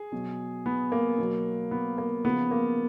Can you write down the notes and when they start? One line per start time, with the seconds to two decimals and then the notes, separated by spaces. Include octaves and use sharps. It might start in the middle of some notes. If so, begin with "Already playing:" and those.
Already playing: G#4
0.12 B2 F#3
0.66 B3
0.92 A#3
1.18 B2 F#3
1.71 B3
1.98 A#3
2.25 C#3 F3 B3
2.51 A#3